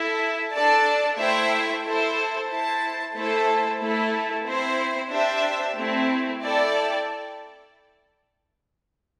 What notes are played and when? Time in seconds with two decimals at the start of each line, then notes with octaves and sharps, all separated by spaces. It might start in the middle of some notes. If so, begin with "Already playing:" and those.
Already playing: E4 A4 E5
0.53 D4 A4 D5 A5
1.18 A3 E4 C5 E5 G5
1.84 E4 A4 C5
2.50 E4 C5 A5
3.15 A3 E4 A4 C5
3.81 A3 E4 A4
4.46 C4 E4 C5
5.11 D4 G4 C5 E5
5.77 A3 C4 E4
6.42 E4 A4 D5 G5